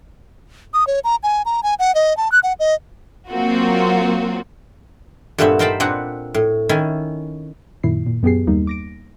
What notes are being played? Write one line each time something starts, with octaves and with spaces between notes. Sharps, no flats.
D#6
C#5
A#5
G#5
A#5
G#5
F#5
D#5
A5
F#6
F#5
D#5
F#3 A#3 C4 F4 F#4
G2 A#2 A3 B3 C4 E5
D#4 A#4 C5 G5 A5 B5
A#2 C4 D4 B4 F#5 A#5
A2
D#3 C#4 E4 G#5
F#2 A#2 D#3 E4 C7
A#2
F#2 B3 G4 G#4 C7
D#2 G3 A#3 D#4
D6 A#6 D7